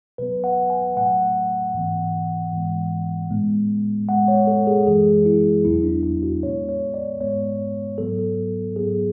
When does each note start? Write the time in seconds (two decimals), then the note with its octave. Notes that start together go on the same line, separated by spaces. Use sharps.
0.18 B2 F#3 B3 B4
0.44 F#5
0.70 G#5
0.96 A2 F#3 A3 F#5
1.74 G#2 E3 B3
2.53 G#2 E3 G#3 B3
3.31 A2 G#3 B3
4.09 A2 G#3 B3 F#5
4.28 C#5
4.47 A4
4.67 G#4
4.86 F#2 E3 G#3 G#4
5.26 E4
5.64 E2 B2 F#3 B3 E4
5.84 D4
6.03 E4
6.23 F#4
6.43 A2 G#3 B3 C#5
6.69 C#5
6.94 D5
7.20 G#2 G#3 B3 C#5
7.98 G#2 F#3 B3 A4
8.76 G#2 F#3 B3 G#4